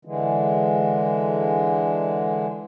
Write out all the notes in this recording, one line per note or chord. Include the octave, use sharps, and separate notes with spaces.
D3 E3 G#3